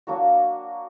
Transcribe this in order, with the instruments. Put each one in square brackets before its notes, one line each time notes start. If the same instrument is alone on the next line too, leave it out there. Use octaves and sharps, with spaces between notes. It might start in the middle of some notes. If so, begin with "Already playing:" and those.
[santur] F#3 A#3 D4 F#4